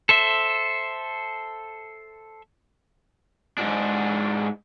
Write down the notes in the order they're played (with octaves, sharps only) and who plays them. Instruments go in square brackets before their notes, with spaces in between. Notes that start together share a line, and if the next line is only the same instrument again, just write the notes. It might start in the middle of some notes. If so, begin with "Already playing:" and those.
[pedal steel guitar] A4 C5 E5
[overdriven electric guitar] G#2 D4